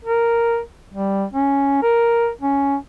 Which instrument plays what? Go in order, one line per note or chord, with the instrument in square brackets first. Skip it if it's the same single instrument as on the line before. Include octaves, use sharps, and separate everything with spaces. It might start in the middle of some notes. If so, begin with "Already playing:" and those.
[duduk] A#4
G3
C#4
A#4
C#4